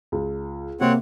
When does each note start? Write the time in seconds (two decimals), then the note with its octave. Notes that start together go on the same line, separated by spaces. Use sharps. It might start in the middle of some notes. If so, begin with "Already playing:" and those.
0.12 C#2
0.81 C3 A#3 C4 C#5 F#5